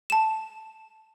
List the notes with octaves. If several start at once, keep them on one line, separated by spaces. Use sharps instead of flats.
A5 E7